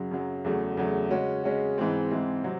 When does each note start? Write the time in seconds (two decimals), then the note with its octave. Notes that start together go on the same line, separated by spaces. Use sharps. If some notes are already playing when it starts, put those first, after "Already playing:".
Already playing: F#2 C#3 F#3
0.11 F#2 C#3 F#3
0.45 E2 C#3 F#3 A3
0.77 E2 C#3 F#3 A3
1.10 C#3 G#3 C#4 F#4
1.44 C#3 G#3 C#4 F#4
1.78 G#2 E3 G#3 C4
2.11 G#2 E3 G#3 C4
2.44 C3 F#3 C4